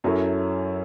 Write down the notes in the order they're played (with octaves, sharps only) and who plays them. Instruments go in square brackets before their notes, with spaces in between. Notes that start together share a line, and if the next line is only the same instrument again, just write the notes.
[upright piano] F#2 F#3 C#4 E4 A4